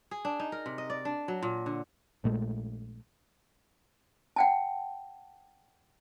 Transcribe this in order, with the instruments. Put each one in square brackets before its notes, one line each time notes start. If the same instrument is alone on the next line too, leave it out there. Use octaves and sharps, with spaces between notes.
[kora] G#4
D4
D#4
A#4
C3
D#5
D5
D4
F#3
A#2
D3
[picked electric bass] A#1 A#2 G#3 A3
[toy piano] F#5 G5 A5